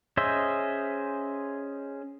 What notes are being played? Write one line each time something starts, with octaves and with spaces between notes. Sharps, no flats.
C#4 G#4 C5 D#5 E5